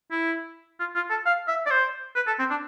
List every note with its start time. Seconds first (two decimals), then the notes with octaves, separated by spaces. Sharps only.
0.12 E4
0.80 F4
0.96 F4
1.10 A4
1.26 F5
1.48 E5
1.66 D5
1.71 C5
2.16 B4
2.27 A4
2.39 C4
2.50 D4